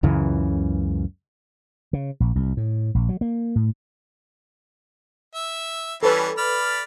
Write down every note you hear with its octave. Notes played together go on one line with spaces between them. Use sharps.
C#2 F#2 C#3 E3
C#3
A#1
C2
A2
A#1
F#3
A#3
A2
E5
E3 G3 C#4 A4 B4
D5 B5 F6